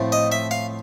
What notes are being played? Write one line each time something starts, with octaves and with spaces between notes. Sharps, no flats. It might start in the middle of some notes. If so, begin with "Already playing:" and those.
Already playing: A2 F3 A3 C4
D#5
E5
F5